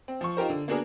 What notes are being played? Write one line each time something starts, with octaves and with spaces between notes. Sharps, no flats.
C4
F3 C#6
D#4 F4 G4 A#4 C5
D3
A#3 B3 D4 F#4 G#4 A#4